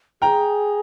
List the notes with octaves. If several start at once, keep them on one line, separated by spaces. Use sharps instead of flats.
G#4 G5 A#5